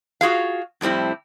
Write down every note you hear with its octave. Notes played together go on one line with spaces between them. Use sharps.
F4 F#4 G#4 F5
F2 A2 G3 C4 E4